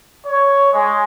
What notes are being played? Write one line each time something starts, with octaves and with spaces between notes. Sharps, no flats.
C#5
G#3